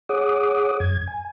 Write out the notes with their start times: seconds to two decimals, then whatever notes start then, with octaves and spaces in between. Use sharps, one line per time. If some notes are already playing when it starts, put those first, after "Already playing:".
0.09 G#4 C#5 F#5 D6 D#6
0.80 F#2 G#6
1.08 G#5